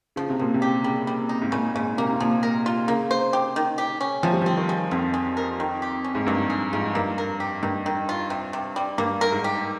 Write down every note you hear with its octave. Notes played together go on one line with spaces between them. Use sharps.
C#3 F3
C3
A#2 F3
C3
G4
C#3 G3
G3
D#4
G#2
A#2 C#3
G#2 C#3
C3 A#3
C3
A#2 F3
A#4
F4
C#3 A#3
C5
G4
D#3
G4
C#4
C3 F3
G3
F3 C4
D#3
G#3
F2 G#3
G#3
A#4
D#3
G4
C#4
G#2
G2 A#3
G#4
G#2 F4
G2 A#3
A#4
G4
G2 D#3
D#3
F4
C3
C3
G3
G2 A#3
A#4
G#2
G4